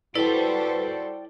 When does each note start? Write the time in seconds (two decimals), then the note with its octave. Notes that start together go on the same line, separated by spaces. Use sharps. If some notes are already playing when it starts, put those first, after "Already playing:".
0.16 E4 F#4 A4 B4 C5 D5 G5